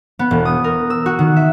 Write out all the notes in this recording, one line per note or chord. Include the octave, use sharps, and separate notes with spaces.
B3
E1
D#6
A#4
E6
F#4
D#3
E5